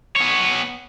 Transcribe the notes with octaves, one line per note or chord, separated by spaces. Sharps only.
B3 C#5